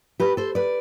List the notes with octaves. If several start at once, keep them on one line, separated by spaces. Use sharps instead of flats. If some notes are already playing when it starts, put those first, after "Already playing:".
G4 B4
A4 C5
B4 D5